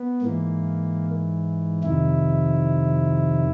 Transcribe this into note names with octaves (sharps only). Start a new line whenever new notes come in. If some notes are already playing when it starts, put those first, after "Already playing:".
Already playing: B3
G#2 E3 A#3
F2 C3 D#3 E4